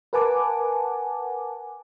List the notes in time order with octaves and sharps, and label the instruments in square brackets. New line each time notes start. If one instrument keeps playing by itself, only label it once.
[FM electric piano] A#4 B4 F#5 G#5 A5 D6